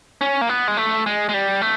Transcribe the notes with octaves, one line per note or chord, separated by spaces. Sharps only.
C#4
A#3
B3
G#3
A3
G#3
G#3
G3
A3